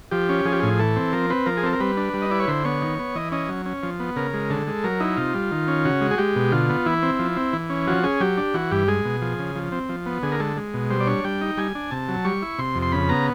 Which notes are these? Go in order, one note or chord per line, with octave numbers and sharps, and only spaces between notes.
F3 G4
C#4
F3 G#4
G4
A2 G#4
E3 A4
C4
F3 A#4
C4 B4
F3 A#4
G#4
C4 A4
A#4
G3 B4
D4
G3
D#5
E4 D5
C#5
D3 C5
B3 C#5
D#3
B3
E3 D#5
C#4 D#5
F#3
C#4
F3
B3
C#3 A#4
G#3
D3 A4
G#3
F#3 A#4
D#4 E4
C3 F4
G3
D#3
C#4
C#3 F#4
G#3
G#4
G#3 G4
B2
D3 F4
B3
E3 E4
C4
F3
C4
E3
C#4
F3 F#4
C#4 G#4
F#3 G4
D4
E3 F#4
G2 G4
G#3 G#4
B2
F3
C#3
F3
C4
F3
B3
D3 G#4
A#4
G#3 A4
G#3
B2
G3 C5
D5
D4 C#5
G3 G5
D#4
G3 G#5
D4
C3 A5
F#3
G3 C#6
E4
C3 C6
F2
C6
C#3 B5
B3 A#5